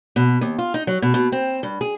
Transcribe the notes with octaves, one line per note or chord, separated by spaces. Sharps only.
B2
D#2
F4
D#4
F#3
B2
B2
C4
G2
G#4